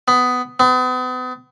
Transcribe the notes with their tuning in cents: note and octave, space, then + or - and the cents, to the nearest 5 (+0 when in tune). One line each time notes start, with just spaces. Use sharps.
B3 +15
B3 +40